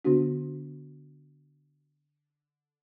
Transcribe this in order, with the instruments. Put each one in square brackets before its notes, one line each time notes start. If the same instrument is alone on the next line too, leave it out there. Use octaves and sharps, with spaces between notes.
[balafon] D3 B3 D4 F#4